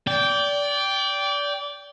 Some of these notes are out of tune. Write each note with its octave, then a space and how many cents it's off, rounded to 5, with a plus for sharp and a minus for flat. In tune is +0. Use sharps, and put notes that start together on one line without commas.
D5 -25 G5 +0